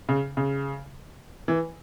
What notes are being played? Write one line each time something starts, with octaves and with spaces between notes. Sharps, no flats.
C#3
C#3
E3